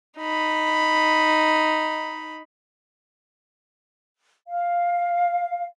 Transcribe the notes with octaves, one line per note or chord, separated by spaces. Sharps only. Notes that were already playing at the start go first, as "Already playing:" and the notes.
D#4 B5
F5